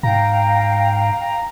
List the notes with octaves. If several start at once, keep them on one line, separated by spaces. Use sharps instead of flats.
G#2 F5 G5 A#5